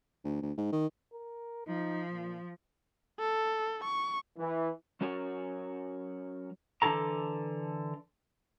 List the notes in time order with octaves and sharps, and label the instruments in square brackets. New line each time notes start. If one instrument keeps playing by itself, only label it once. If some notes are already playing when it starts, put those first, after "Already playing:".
[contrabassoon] D2
D2
G#2
D#3
[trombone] A#4
[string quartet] F3 [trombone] D#4
[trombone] A#2
[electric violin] A4
C#6
[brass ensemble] E3
[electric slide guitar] F#3 C#4 F#4 A#4 C#5
D3 E3 D4 E4 A4 A#5